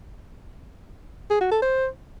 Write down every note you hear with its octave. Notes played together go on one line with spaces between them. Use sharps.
G#4
F#4
A4
C5